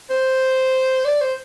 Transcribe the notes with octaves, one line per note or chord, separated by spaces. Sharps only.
C5
D5
C5